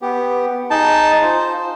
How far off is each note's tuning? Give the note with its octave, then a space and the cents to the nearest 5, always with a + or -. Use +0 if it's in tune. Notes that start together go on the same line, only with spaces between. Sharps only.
B3 +0 G4 +0
D#4 +0 G#4 -5 A5 +0
F4 +0 C5 +0